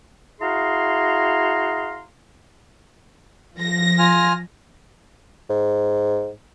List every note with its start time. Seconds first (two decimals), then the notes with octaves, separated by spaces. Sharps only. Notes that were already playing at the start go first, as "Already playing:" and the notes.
0.41 E4 F#4 G#4 F5 A#5 C6
3.56 F3 A#6
3.99 F4 G#5 F6
5.49 G#2